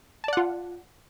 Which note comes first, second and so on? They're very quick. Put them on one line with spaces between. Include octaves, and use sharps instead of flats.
A5 D5 F#5 F4